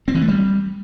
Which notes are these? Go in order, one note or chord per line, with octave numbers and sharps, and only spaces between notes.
C4
E3
A3
G3